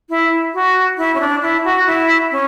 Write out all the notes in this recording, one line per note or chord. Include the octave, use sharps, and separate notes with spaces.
E4
F#4
E4
C#4
D4
E4
F#4
E4
C#4